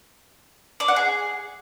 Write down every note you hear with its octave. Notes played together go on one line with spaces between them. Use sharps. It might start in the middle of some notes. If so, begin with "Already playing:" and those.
D5
F#5
G#4